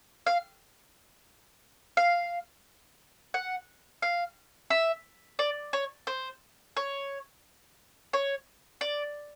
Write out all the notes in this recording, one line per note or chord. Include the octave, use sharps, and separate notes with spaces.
F5
F5
F#5
F5
E5
D5
C#5
C5
C#5
C#5
D5